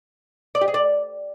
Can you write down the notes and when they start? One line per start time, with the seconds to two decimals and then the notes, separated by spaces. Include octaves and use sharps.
0.55 D5
0.61 G4
0.68 G#4
0.74 D5